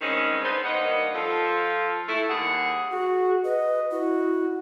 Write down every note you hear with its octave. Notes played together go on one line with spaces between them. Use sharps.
G2 D#3 G#3 C4 C#4 D#4
B3 D#4 C5
G2 D#3 A#3 B4 D#5 F#5
F3 F4 A4
A3 E4
D#2 G3 G#4 F#5
F#4 G#4
B4 D#5
E4 F#4